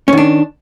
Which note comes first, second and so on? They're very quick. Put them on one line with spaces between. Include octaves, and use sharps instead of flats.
C#4 D#3 D4